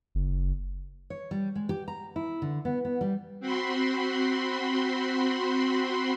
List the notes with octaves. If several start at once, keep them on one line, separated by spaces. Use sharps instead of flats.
F#1
C#5
G3
G#3
G4
A#5
E4
D3
B3
B3
G3
C4 F#4 B5 C6